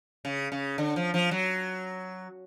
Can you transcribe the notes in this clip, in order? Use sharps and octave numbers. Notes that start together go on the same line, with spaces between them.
C#3
C#3
D3
F3
F3
F#3